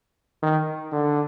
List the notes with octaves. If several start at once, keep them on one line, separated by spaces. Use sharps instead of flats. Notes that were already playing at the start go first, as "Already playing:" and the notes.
D#3
D3